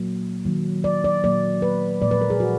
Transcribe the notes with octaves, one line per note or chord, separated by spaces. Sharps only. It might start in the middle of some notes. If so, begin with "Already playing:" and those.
Already playing: A#2 F#3 A#3
D#3 F#3 A#3
D5
D5
A#2 F#3 A#3 D5
B4
A#2 F3 G#3 D5
B4
A#4
G#4
F#4